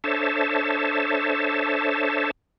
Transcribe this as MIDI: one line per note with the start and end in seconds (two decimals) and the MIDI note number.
0.04 2.31 62
0.04 2.31 69
0.04 2.31 72
0.04 2.31 73
0.04 2.31 76
0.04 2.31 81